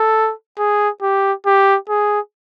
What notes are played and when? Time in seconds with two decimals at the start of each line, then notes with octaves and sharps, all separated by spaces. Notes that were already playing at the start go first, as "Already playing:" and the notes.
Already playing: A4
0.58 G#4
1.02 G4
1.46 G4
1.89 G#4